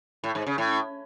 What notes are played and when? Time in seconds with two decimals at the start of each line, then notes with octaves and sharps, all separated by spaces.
0.24 A2
0.35 G#2
0.46 C#3
0.58 A2